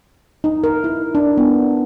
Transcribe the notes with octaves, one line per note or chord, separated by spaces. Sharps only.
D#4
A#4
E4
D4
B3